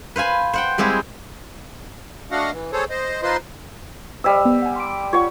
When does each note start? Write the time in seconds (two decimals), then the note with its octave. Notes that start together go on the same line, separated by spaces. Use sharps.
0.16 B4 C5 F5 G#5 B5
0.53 C5 F#5 G5
0.78 G3 G#3 C4 E4 G4 G#4
2.31 A3 D4 F#4 D#5 F5 F#5
2.51 E3
2.73 G#4 A4 C5 C#5
2.90 C5 D#5
3.23 D#4 F4 B4 C5 D#5 C6
4.24 G3 C5 D#5 E6
4.45 B3
4.62 F#5 G#5
4.76 C6 D6 D7
5.13 F4 C#5 F#5 C#6